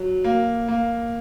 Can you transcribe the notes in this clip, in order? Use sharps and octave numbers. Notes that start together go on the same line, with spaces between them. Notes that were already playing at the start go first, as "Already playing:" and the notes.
Already playing: F#3
A#3
A#3